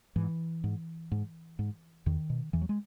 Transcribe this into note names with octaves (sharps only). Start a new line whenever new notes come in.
G#2 E3
G#2
G#2
G#2
E2 D#3
B2
E2 E3
F#3
G#3